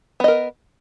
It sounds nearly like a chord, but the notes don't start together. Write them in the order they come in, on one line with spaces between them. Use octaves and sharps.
B3 D#5 A#4